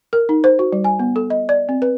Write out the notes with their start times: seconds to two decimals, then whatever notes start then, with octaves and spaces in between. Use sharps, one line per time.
0.13 A#4
0.29 D#4
0.44 C5
0.59 F#4
0.72 G3
0.84 G#5
0.99 B3
1.16 A4
1.30 D#5
1.49 D5
1.69 C4
1.82 B4